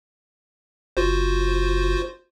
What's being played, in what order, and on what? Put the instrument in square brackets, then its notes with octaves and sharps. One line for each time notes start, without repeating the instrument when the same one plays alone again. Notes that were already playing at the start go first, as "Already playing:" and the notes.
[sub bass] F#1 [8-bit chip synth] F4 F#4 C5